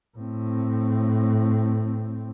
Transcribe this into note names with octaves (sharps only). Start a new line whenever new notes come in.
A2 C4